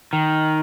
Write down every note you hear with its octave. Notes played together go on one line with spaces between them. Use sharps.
D#3